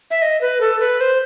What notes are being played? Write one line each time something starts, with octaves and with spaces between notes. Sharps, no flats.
E5
D#5
B4
A4
B4
C5